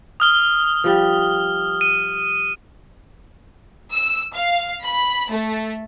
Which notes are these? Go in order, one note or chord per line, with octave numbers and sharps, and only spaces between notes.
D#6 F6 G7
F3 G3
D#7
E6
F5
B5
A3